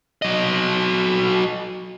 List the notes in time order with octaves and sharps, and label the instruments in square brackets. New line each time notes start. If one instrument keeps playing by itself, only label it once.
[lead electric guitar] F#3 D#5